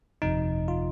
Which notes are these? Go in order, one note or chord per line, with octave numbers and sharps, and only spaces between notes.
G1 F2 C3 F3 D#4
F4